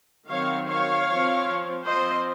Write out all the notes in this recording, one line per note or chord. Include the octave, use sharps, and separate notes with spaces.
D#3 F#3 C4 C#5 F5
C#5 F5
F3 C4
F3 C4 C5 D#5